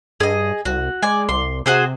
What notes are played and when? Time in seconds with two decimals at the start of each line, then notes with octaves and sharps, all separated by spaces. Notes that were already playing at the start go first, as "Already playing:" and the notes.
0.20 G2 G#4 D#5
0.65 C2 F#4
1.03 G#3 D5 G#5
1.29 C2 C6
1.66 C3 F#4 G#4 C5